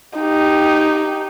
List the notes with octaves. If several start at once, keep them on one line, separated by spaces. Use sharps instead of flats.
D#4 G4